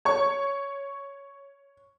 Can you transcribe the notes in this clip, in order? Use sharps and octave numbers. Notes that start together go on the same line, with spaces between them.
C#5 C#6